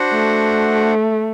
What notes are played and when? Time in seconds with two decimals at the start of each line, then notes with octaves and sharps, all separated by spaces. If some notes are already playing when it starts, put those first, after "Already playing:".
Already playing: D4 F#4 C5 F#5
0.11 A3